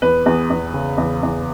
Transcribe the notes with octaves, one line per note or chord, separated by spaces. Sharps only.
E2 B4
E2
E2
C#3
E2
E2